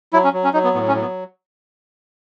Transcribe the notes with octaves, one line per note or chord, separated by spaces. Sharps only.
F#3 E4
C#4
F#3
C#4
F#3 D#4
B3
A2 B3
C#4
F#3
B3